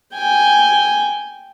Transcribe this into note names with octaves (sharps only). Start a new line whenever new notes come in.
G5 G#5